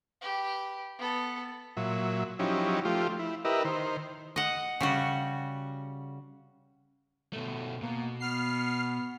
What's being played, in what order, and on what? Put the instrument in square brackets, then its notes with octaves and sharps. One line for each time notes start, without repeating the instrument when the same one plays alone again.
[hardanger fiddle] G4 B4
B3 A4
[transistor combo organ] A#2 F#3 E5
F3 F#3 C#4 D#4 E4 G4
F3 A3 F4 G4
E4
E4 G4 A#4 B4 D#5 E5
D#3 C5
[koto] D#5 F#5
C#3 G3 F#4
[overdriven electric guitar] B2 A3
[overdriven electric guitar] B2 [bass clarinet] A#3
[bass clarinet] B3 [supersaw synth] F6 C7